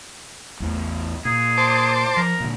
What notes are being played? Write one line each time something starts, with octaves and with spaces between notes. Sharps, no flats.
A1 E2 A3
A#2 G#4
C5 A5 D6
F3 A#4
A#2 D3